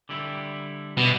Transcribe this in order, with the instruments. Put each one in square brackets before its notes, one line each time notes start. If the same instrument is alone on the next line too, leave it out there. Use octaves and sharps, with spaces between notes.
[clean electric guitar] D3 G3 E4 G4
[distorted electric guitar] B2 [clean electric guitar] G3 B3 E4 G4